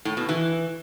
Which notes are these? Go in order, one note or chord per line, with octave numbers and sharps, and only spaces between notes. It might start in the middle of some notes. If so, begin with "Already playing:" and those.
A2
B2
E3